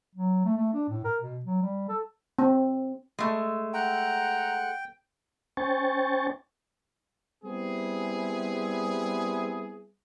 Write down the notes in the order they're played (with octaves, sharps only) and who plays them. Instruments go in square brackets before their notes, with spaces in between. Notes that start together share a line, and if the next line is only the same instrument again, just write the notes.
[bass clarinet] F#3
A3
A3
D4
A2
A#4
B2
F#3
G3
A4
[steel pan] C4
[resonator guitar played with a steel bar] G#3 A3
[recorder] F#5 [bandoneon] G5 [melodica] A#5
[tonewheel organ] C#4 C5 G5 G#5 C#6 A6
[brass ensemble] G3 B3 C4 E4 G#4